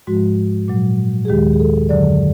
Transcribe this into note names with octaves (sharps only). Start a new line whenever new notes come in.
G#2 F3 G#3 F#4
A#2 F#3
G#4
D#2 D#3 G#3 G4
G#4
A4
F#2 D3 F#3 D5